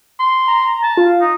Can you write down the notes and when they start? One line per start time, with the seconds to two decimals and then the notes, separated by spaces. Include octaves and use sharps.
0.20 C6
0.47 A#5
0.83 A5
0.97 F4
1.21 D#4